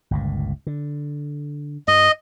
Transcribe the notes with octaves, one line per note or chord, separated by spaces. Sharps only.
G1 C#2 A#2
D3
G2 D#5